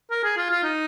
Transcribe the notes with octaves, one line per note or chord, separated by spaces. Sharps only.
A#4
G#4
F4
F4
D#4